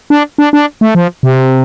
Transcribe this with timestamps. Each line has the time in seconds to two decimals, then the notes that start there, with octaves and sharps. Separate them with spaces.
0.10 D4
0.38 D4
0.53 D4
0.81 A3
0.95 F3
1.23 C3